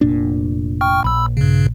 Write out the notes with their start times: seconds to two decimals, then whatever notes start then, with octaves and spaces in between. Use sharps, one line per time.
0.01 F1 A#2 D4
0.81 G5 C#6 F6
1.04 A#1 B5 E6
1.37 G2 C#3